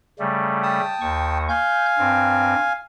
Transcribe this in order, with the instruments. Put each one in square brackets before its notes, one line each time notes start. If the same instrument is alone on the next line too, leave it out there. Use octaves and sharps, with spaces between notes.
[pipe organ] C#3 G3 A3
[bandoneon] G5 A5 D#6
[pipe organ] D#2 C#6
[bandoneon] F5 G#5 [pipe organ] G6
[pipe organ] G2 C4